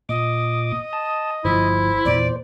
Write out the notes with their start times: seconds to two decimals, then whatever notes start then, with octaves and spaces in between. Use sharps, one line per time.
0.09 A#2 D#5 D6
0.93 A5
1.45 G1 F3 E4 C5
2.05 E2 A#2 E3 D5